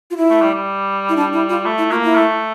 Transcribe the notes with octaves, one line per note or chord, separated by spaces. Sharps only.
F4
E4
A3
G3
G3
E4
D4
E4
F4
A3
E4
A#3 F4
E4
A3